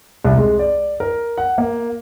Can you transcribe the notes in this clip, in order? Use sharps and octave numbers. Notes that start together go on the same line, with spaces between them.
C2
G#3
D5
A#4
F#5
A#3